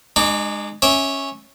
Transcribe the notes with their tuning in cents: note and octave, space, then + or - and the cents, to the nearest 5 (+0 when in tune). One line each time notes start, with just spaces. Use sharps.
G#3 +0 D#4 -45 D6 -25
C#4 -10 E5 -20 D6 +0